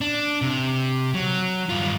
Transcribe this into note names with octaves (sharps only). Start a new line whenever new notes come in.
D4
C3
F#3
G2 F4